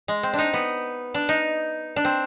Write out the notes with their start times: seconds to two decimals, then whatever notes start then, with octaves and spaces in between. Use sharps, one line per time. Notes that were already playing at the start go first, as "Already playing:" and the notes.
0.08 G#3
0.23 C4
0.33 D4
0.39 D#4
0.54 B3
1.14 D4
1.29 D#4
1.96 D4
2.05 C4